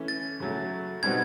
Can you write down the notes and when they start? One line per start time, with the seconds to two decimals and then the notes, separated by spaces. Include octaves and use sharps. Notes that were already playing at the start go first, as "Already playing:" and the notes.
Already playing: E3 A3 C#4
0.08 A6
0.40 C#3 F#3 A3
1.03 B2 G3 C4 D#4 F#4 G#6